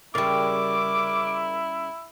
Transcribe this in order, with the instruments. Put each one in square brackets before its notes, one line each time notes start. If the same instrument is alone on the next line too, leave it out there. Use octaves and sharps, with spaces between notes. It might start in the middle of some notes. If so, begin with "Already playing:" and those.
[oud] C#3 G3 [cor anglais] E4 [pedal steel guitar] A#4 D5 C#6 [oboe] D6